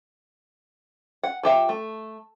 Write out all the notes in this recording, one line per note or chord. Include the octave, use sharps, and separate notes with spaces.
F#5
F3 G4 E5
A3